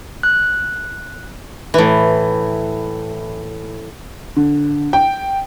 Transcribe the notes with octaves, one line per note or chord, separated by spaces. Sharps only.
F#6
A2 E3
D3
G5